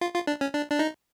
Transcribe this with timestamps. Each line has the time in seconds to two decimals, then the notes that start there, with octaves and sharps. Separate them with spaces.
0.01 F4
0.14 F4
0.27 D4
0.41 C#4
0.54 D4
0.71 D4
0.79 D#4